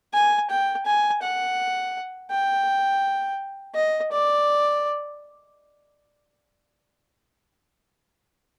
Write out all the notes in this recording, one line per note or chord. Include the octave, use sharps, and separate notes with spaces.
G#5
G5
G#5
F#5
G5
D#5
D5